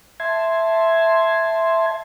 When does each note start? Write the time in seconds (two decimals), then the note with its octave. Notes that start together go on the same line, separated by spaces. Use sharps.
0.20 E5 A5 C6 G#6